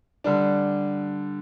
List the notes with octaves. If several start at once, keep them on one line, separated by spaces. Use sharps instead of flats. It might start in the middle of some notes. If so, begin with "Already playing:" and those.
D3 G3 D4